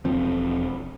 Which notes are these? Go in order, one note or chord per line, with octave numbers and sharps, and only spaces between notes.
E1 F3 C4